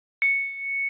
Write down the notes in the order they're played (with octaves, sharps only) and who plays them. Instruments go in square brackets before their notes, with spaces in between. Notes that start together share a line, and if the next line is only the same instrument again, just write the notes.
[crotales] C#7